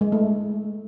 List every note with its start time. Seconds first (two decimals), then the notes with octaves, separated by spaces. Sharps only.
0.01 G#3
0.12 A3